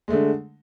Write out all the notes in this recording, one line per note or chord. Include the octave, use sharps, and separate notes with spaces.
D3 G#3 A3